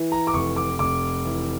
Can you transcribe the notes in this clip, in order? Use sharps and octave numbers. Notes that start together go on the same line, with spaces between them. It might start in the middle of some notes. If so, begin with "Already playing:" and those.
Already playing: E3
A#5
D6
F1 C#6
D6
F1 D6
E3